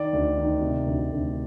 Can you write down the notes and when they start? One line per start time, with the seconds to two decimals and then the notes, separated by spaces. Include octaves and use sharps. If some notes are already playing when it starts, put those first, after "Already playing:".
Already playing: D#3 D5
0.13 D2
0.37 D#3
0.61 C3
0.86 D2
1.11 D2